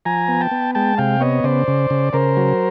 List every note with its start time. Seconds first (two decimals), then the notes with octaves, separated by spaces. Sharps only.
0.05 F3 G#5 A#5
0.28 B3
0.41 G5 A5
0.51 B3
0.75 G#3 G5 A5
0.98 C3 F5 G5
1.20 B3 C#5 D#5
1.44 C#3 C5 D5
1.68 C#3
1.90 C#3
2.13 C#3 A#4 C5
2.37 F#3